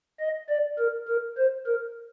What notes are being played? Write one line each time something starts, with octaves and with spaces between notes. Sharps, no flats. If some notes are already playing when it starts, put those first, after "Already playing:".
D#5
D5
A#4
A#4
C5
A#4